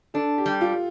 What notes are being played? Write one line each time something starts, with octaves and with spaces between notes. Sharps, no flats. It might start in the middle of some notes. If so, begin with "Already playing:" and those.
D4 A4
G4
G3
F4